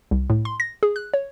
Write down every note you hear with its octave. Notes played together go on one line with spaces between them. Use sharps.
C2
A2
C6
A#6
G#4
F#6
C#5